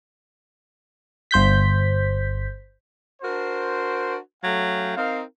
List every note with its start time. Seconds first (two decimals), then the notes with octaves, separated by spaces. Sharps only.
1.31 G1 C5 G6 B6
3.22 D4 F#4 A#4 C5
4.44 F#3 A3 C#4 F5 G5
4.96 C4 D#4 A#4 F5